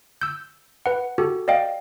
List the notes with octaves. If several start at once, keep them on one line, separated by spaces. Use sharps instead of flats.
E6 G6
B4 F#5
F#4 G4 A4
D5 D#5 F5 G5